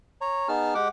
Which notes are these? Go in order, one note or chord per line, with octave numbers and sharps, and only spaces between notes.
C#5 A#5
B3 D#4 G#4 A5 F6
G#3 G4 F#5 G5 D6